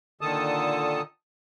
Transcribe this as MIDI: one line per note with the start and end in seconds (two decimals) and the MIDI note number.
0.21 1.01 46
0.21 1.01 50
0.21 1.01 51
0.21 1.01 69
0.21 1.01 81
0.21 1.01 87